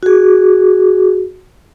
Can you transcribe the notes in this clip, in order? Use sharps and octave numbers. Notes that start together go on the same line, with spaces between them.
F#4 G#4